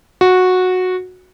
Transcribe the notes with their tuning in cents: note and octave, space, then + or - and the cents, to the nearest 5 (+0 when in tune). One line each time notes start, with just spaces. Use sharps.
F#4 -10